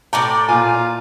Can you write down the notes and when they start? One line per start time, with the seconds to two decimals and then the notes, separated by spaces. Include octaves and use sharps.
0.13 A2 D5 G5 A5 A#5 D6
0.49 A#2 F4 G#5